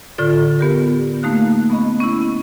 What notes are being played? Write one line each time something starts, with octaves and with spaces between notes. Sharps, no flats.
A2 D3 F4 A4 D5
B3 G4 A#4
A3 A#3 D#4 F5 F#6
B3 C#4 D#5 B5
C#4 E4